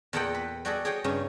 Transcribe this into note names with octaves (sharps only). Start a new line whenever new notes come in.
E2 A#2 A4 D#5 F#5 G5
B4
G3 F#4 G#4 A4 D5 D#5
G#4 C#5 D#5 G5
G2 C#3 C#4 D#4